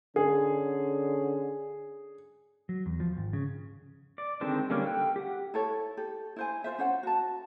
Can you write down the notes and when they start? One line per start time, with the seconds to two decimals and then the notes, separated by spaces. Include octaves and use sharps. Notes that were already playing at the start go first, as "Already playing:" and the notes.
0.16 D3 C#4 G#4
2.69 F#3
2.86 E2
3.00 F3
3.17 G#1
3.33 C#3
4.18 D5
4.41 D3 D#3 G#3 C4 D4
4.70 D3 G3 A#3 C#4
4.86 A4 G5 F#6
5.16 G4 F#5
5.54 E4 A4 C#5
5.97 G4 A4
6.36 E4 C5 G#5
6.64 F4 C5 E5
6.78 C#4 C5 F#5
7.03 F#4 A5